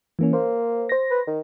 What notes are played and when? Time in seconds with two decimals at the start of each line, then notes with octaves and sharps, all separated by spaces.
0.19 E3 A#3 C#4
0.33 A#3 C5
0.89 C5 A#6
1.11 B4
1.27 D#3